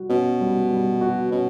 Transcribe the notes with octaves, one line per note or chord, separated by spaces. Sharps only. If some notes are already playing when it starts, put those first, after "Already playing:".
Already playing: G3 F#4
B2 C#4
G3
G3
F#4
B2 C#4